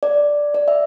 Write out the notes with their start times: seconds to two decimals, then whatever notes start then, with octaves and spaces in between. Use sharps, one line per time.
0.03 D5
0.54 D5
0.68 E5